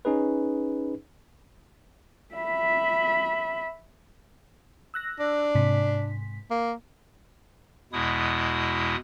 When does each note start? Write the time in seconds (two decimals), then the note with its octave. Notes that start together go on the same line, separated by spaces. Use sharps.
0.05 C#4 D#4 G#4 B4
2.35 E5 B5
4.94 E6 F#6 A#6
5.19 D4
5.55 G#2 C3 B6
6.50 A#3
7.93 E2 B2 G#3 E4 D#6